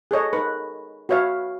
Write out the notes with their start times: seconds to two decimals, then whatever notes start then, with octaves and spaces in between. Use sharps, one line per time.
0.11 G#4 A4 C#5 D#5
0.33 D#4 A#4 B4
1.09 F#4 B4 C#5 E5 F5